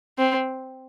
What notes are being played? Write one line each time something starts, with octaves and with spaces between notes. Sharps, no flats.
C4